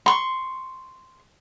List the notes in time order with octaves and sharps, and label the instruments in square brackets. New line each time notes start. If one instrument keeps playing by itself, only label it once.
[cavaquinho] C6 C#6